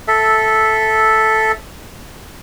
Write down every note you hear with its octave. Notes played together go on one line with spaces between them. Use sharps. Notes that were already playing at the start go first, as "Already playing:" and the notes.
A4 E5